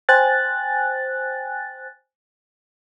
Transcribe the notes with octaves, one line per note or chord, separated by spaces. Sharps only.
C5 G5 G#5 F#6 A6